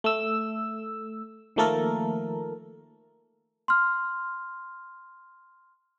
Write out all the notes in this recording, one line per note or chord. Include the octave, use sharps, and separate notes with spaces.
A3 E6
D#3 F3 A3 A#3 A4 A#4
C6 F6